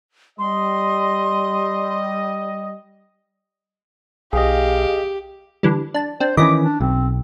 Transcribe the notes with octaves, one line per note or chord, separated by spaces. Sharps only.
G3 D#5 C6
B1 G4 G#4 D#5 F5
D3 E3 G3
D4 A5
C4 D4 C5
D#3 E3 C#4 D#5 B5 D6 A#6
D4
B1 C4